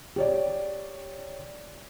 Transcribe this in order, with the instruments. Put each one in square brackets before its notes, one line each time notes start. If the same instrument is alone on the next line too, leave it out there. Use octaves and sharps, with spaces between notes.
[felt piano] G4 C#5 D5